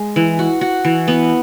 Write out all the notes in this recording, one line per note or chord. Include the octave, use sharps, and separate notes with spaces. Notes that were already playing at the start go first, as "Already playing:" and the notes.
Already playing: G#3
E3
F#4
F#4
E3
B3